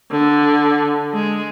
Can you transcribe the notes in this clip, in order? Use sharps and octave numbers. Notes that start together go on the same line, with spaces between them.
D3
G#3